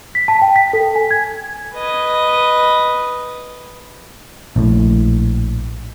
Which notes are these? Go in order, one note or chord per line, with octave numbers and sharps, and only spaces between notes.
B6
A5
G5
B6
A4
G#5
G#6
B4 D#5
A#1 A2